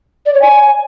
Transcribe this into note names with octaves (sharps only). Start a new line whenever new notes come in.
D5
C#5
G#5